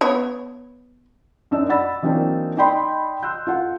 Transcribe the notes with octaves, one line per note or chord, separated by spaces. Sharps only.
B3 C#5
F#2 D4 D#4 E6
D5 F#5 B5 E6 A6
E3 F#3 A#3 C4 D4 D#4
D#4 D5 D#5 G5 B5 C6
C6 E6 F#6 G6
F4 A4 F#5